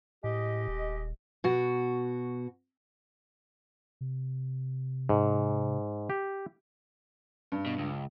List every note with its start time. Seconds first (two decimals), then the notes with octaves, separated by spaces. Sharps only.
0.24 A2 G#3 G4 D#5
0.68 D#1
1.44 B2 F#4
4.01 C3
5.09 G#2
6.10 G4
7.52 G2
7.66 B2
7.78 C#2